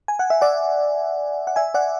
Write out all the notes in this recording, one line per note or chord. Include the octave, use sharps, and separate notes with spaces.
G#5
F#5
E5
D5 F#5
F#5
E5 G#5
D5 F#5